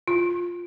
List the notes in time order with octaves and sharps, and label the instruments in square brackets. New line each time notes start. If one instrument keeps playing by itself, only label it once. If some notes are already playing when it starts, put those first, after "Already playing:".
[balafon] F4